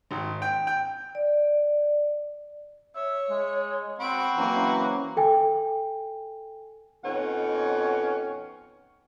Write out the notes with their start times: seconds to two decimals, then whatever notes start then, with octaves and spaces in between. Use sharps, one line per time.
0.11 G#1
0.42 G5
0.67 G5
1.15 D5
2.95 C#5 E5
3.30 G#3
4.01 C4 F#5 B5 C#6 D7
4.37 E3 F#3 A#3 C#4 A#5
5.17 A4 G5 G#5
7.04 F2 B2 C#4 D#4 F#5